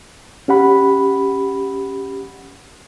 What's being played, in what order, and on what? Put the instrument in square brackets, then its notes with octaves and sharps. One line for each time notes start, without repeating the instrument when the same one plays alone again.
[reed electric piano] C#4 G4 F#5 B5